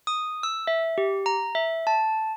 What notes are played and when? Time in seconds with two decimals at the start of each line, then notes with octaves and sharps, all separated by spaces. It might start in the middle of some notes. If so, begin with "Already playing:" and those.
0.07 D#6
0.43 E6
0.67 E5
0.98 G4
1.26 A#5
1.55 E5
1.87 A5